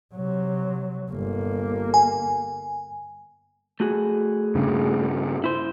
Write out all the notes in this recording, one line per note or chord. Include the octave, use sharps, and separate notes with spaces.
C3 F#3
G1 A#3
G#5
A3 F#4 G#4
G2 C#3
E4 C5